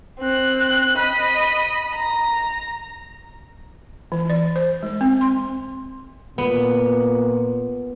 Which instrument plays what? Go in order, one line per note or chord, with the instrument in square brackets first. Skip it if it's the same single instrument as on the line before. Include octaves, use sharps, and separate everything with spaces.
[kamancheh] C4 F#6
D#5 B5
A#5
[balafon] E3
D5
C5
G#3
C4
C6
[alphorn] A#2 [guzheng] B3